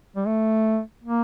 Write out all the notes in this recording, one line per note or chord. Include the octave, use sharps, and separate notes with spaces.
G3
A3
A#3